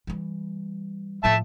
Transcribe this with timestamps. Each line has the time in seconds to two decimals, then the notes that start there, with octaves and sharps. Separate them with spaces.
0.07 E3 G3
1.24 A2 F3 E5 A5